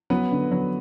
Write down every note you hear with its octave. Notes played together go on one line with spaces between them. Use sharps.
F#3 B3 B4
D3
F#3